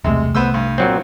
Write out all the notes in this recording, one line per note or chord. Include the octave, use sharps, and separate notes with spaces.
E1 C2 C3 G#3 A3
C2 A3 B3 C5 E6
G2
A#2 F#3 C4